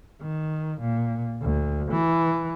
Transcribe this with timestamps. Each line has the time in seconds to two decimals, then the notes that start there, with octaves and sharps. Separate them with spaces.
0.22 D#3
0.81 A#2
1.42 D2
1.91 E3